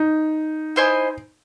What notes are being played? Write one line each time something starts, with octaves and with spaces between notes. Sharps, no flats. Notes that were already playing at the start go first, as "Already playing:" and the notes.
Already playing: D#4
E4 C5 D#5 G#5